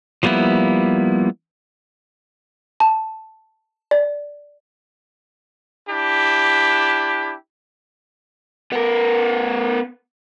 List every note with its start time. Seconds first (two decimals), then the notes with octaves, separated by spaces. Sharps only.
0.23 F3 G3 A#3 B3 E4
2.80 A5
3.91 D5
5.89 D4 E4 G4
8.72 B3 A#4